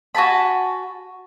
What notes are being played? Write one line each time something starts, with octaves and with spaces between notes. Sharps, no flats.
F#4 G#5 A5 B5